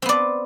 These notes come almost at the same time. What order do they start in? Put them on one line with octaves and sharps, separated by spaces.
C4 B3 D5